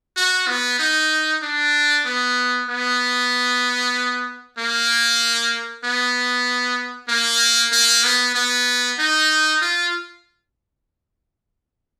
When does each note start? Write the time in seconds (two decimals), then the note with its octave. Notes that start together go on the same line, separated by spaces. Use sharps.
0.17 F#4
0.48 B3
0.79 D#4
1.42 D4
2.06 B3
2.68 B3
4.58 A#3
5.84 B3
7.09 A#3
7.72 A#3
8.04 B3
8.35 B3
8.99 D#4
9.61 F4